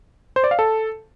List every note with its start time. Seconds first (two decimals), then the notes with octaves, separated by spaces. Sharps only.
0.36 C5
0.44 D5
0.51 F5
0.59 A4